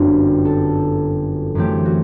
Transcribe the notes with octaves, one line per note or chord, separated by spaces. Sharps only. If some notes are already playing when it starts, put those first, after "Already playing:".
Already playing: G1 F#2 D3 F#3 C4 G4
A4
F#2 E3 A3 C4 G4
F#4